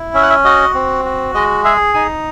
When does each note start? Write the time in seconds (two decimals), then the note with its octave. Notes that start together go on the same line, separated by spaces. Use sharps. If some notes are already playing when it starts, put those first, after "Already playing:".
Already playing: E4
0.14 C#4 E5
0.22 F#5
0.30 E5
0.45 F#4 D#5
0.74 C4
1.05 F#4
1.35 G#3 D#5
1.64 G#4 E5
1.94 D#4 G#5